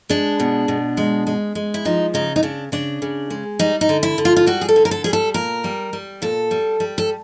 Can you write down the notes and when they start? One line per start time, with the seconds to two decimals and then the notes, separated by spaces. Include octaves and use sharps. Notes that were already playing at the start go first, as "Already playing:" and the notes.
0.09 G#3 D4
0.40 B2
0.68 B2
0.97 G#3
1.27 G#3
1.55 G#3
1.74 E4
1.85 F3 D#4
2.14 C#3 D#4
2.36 D#4
2.43 C#3 D4
2.72 C#3 D4
3.02 C#3
3.30 G#3
3.59 G3 D#4
3.81 D#4
3.89 D3
4.03 E4
4.18 D3
4.25 F4
4.36 F4
4.47 G3 F#4
4.61 G#4
4.69 A4
4.76 D3
4.85 A#4
4.91 A4
5.04 G3 G#4
5.13 A4
5.34 A#2 A#4
5.64 G3
5.93 G3
6.22 A#2 A4
6.51 G3
6.80 G3
6.98 A4